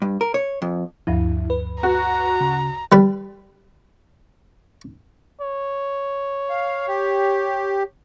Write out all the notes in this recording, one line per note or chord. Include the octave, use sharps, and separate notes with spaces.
G2
A#4
C#5
F2
D2 G2 F3 E4
B4
F#4 A#5
C#3
G3 B4
C#5
F5
G4